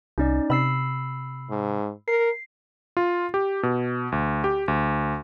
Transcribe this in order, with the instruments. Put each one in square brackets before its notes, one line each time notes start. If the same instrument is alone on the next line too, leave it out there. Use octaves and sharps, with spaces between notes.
[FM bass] C2 [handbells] C#4 D#4 D5
[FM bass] C3 [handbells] B5 E6 C7
[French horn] G#2
[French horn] A#4 [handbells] C7
[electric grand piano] F4
G4
B2
D2
G4
D2